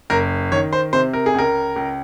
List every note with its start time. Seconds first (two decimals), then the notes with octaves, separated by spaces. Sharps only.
0.10 F#1 A#4
0.52 D#3 C#5
0.73 C5
0.93 C3 C5
1.13 A#4
1.26 G#4
1.35 C#2 A#4
1.76 C#2